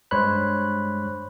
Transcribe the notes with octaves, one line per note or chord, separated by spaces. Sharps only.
G2 G#3 C5 C#5 B5 F#6